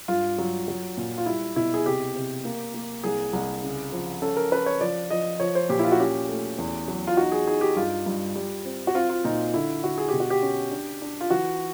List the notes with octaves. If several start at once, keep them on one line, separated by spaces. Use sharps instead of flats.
G2 F4
F#3
F#3
A#2
F4
G3 E4
B2 E4
G#4
C3 G4
C3
A#3
A#3
C2 G#4
C2
C#3
F3
C#4 A4
A#4
C#4 B4
C#5
F3 D5
F3 D#5
F3 C#5
C5
A#2 G4
E4
F4
F#4
C#4 G4
A3
E2
F#3
F4
D#4 F#4
G#4
D#4 G#4
G4
G2 F4
G2
G3
C4
F#4
C4 F4
F4
A#2 D#4
D3 E4
D3 F#4
G#4
B2 G4
F#4
G4
C#4
D4
D4
F4
E3 F#4